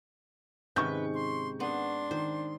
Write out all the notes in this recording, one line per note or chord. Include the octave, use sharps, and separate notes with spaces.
G#2 C3 D#3 C#4 B4 C#6 G6
C6
B3 D4 C6
D#3 C5